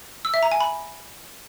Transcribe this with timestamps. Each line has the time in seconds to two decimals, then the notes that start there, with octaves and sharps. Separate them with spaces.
0.25 E6
0.34 E5
0.43 A#5
0.52 G#5
0.60 B5